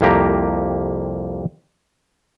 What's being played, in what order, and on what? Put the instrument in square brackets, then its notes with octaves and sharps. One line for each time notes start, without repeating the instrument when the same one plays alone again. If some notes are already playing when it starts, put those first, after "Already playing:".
[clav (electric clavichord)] C2 F2 A#3 G4 A#5